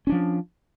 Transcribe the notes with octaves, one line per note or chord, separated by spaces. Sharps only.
F3 C#4 D4